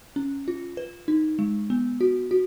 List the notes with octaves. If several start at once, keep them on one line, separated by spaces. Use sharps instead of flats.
C#4
F4
B4
D#4
G#3
B3
F#4
F#4